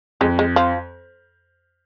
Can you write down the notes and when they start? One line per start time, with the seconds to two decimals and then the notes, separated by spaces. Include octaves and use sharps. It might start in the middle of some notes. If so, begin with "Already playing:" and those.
0.21 F2 G#3
0.39 G#3
0.56 F3